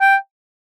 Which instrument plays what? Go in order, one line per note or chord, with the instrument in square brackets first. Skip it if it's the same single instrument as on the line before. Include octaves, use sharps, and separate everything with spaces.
[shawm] G5